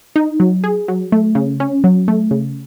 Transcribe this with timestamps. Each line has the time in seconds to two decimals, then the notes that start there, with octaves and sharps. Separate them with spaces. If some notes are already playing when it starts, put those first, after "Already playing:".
0.16 D#4
0.40 F#3
0.64 G#4
0.88 F#3
1.12 A3
1.35 C#3
1.60 C#4
1.84 F#3
2.08 A3
2.31 C#3